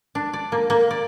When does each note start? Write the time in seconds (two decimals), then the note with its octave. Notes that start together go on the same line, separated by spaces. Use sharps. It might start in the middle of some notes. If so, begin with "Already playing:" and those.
0.15 D4
0.33 D5
0.52 A#3
0.70 A#3
0.91 D5